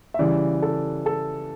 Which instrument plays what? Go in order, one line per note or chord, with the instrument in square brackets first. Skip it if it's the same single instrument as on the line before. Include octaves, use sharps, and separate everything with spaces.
[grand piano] E5
C#3 E3 G3 D5
A4
A4